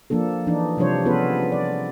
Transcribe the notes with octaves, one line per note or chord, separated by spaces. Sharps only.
F3 A#3 D4 A4
E3 D4 D#4
C3 F3 G3 D4 C5 C#5
B3 C#4 F4 G#4 A4 B4
D5